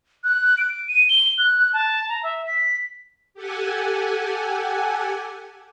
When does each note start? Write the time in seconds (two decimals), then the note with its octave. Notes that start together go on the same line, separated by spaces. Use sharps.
0.24 F#6
0.58 D7
0.88 D#7
1.09 G7
1.38 F#6
1.73 A5
2.09 A#5
2.23 E5
2.47 B6
3.34 G4 A4 F#5 G#5